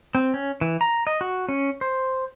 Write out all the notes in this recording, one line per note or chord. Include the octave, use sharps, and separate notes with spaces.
C4
C#4
E3
A#5
D#5
F#4
C#4
C5